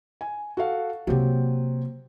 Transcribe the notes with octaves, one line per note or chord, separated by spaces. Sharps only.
G#5
F#4 A4 F5
C3 F#3 A#3 C4 G4